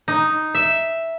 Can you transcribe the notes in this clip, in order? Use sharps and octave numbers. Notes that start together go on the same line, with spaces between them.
D#4
E5